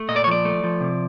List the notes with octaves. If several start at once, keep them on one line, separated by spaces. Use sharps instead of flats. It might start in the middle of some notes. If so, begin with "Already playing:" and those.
Already playing: A3
A#2 D#5
D5
C#5
F3 D5
A3
F3
C3